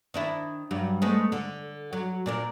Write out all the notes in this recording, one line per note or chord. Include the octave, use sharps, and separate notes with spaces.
D#3 D4 E4
G2 F#3 G3
G#3 A3 B3
D3
F#3
A#2 D4 A#4